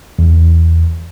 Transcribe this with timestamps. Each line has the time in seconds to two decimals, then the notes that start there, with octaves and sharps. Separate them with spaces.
0.19 E2